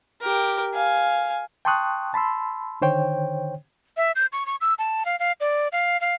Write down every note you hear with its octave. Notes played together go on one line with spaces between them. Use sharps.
G4 A#4
F5 G#5
G5 A5 C6 C#6 D#6 F#6
A5 B5 C6 E6
D3 D#3 C5 C#5 G5
E5
G6
C#6
C#6
E6
A5
F5
F5
D5
F5
F5